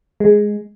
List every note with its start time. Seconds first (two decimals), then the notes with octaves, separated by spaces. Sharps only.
0.20 G#3